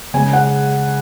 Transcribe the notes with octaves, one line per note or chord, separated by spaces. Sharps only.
C#3 G#3 G#5
F#5